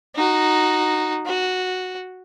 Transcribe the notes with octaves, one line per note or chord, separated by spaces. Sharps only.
D#4 F#4
F#4